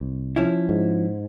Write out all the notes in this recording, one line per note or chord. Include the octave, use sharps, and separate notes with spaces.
C2
F3 C#4 E4
G#2